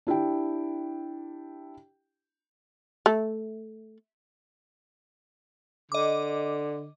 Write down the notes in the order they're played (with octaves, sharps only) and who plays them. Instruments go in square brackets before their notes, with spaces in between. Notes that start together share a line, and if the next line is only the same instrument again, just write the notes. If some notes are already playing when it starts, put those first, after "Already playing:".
[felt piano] D4 E4 G4 G5
[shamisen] A3
[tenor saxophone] D3 [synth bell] D#5 D6